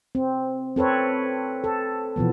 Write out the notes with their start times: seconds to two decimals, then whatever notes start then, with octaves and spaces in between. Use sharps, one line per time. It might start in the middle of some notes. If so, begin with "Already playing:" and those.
0.15 C4
0.76 C4 A4 B4 C#5
1.64 A4
2.16 B2 E3 F3 B3